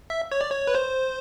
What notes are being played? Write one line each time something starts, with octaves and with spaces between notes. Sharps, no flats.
E5
C#5
D5
C#5
B4
C5